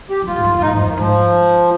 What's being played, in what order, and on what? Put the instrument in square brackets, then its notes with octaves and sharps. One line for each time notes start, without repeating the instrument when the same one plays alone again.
[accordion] G4
[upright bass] F3
[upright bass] G3 [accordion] F4
[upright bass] G#2
G2
F2
[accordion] F4
[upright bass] G#2 [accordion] D#4
[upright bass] G2
[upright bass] F2 [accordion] F3
[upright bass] G2 [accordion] D#3
[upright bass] G#2 [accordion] F3